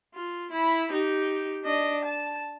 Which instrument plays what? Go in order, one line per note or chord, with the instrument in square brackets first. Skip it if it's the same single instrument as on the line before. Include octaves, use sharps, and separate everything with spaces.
[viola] F4
E4 B5
D#4 G4
D4 D#5
A5